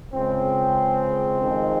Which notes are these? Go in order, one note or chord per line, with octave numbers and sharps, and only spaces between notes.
C#2 C#3 G#3 C4
F2 D#3 G#3